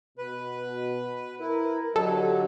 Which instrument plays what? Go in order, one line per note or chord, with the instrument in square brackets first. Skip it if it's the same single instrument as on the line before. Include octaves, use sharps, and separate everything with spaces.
[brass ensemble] B2 [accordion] B4
[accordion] E4 [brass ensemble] A#4
[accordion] D3 F#3 [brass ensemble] G4 D#5 [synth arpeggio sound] A4